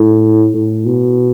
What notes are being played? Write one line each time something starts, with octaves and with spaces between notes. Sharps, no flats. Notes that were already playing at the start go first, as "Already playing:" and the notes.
Already playing: A2
A2
B2